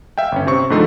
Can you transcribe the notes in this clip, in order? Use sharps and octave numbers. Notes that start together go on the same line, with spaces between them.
E5 F5 G5
G1 C#4
C3 C4 C#6
G#2 D3 F3 A3 D#4 C6